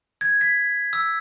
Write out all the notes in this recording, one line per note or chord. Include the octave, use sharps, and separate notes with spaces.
G#6
B6
E6